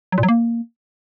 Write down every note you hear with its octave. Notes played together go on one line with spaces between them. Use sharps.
F#3
A#2
F#3
A#3